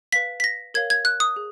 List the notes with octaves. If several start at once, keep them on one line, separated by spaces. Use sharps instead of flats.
B4 F5 B6
B6
A#6
A#4 C#5 F5 G#6
G#6
F#6
D#6
G#4